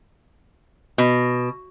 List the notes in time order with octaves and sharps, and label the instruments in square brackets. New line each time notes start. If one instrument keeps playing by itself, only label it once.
[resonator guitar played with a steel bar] B2